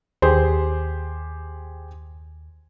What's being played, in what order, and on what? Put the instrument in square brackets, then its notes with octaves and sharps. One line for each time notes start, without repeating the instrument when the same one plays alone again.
[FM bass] D#2 [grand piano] G4 G#4 C5